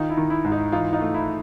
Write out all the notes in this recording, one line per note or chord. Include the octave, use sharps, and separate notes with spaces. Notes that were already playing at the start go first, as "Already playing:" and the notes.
Already playing: D#3 D#4 F4
E4
D#3
E4
G#2
D#4
E3 D#4 F4
D#4 F4
A3
E4